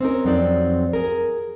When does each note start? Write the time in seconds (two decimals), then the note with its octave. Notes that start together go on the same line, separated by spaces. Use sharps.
0.01 C4 C#4 D#4 A#4
0.25 F2 F#3 C4 D#4 F#4 D5
0.93 G#4 A#4